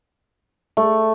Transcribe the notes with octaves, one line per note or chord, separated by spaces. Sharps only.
A3